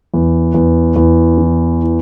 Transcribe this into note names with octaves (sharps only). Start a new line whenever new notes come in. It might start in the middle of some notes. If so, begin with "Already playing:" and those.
E2
E2
E2
E3